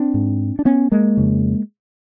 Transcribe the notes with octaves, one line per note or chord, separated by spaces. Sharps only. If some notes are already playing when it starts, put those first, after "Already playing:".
Already playing: C4 D4
G#2
D4
B3 C#4
G#3 A#3
F2 C#3